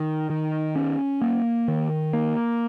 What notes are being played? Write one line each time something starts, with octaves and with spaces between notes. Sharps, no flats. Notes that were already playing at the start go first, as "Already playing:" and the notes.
Already playing: D#3
D#3
C#4
A#3
D#3
A#3